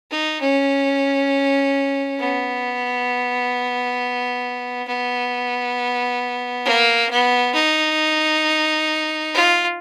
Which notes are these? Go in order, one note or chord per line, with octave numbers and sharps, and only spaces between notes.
D#4
C#4
B3
B3
A#3
B3
D#4
F4